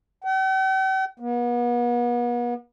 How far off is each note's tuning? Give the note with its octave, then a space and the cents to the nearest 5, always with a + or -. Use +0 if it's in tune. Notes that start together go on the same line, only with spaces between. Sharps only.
G5 -45
B3 -40